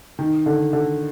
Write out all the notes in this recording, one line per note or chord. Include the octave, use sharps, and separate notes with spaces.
D#3
D3
D3